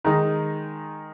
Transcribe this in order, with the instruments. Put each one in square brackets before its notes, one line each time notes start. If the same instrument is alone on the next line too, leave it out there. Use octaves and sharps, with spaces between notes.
[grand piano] D#3 G#3 D#4